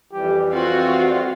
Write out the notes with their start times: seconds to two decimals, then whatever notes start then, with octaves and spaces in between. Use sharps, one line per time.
0.13 F2 E3 G3 G4
0.53 C4 F4 F#4